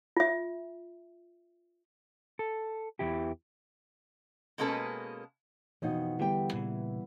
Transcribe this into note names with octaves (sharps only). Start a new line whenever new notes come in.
F4 E5
A4
E2 G2 E3 E4 G4
B2 G#3 A#3 C#4 A4 B4
F2 B2 E3 D#4
E2 D3 G3 B3 E4 G4 G5
A#2 C#3 E3